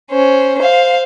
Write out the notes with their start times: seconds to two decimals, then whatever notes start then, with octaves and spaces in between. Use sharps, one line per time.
0.11 C#4 C5
0.59 C5 F5